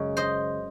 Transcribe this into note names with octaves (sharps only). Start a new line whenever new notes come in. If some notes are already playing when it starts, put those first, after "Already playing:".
Already playing: F#2 C#3 G#3
C5 D#5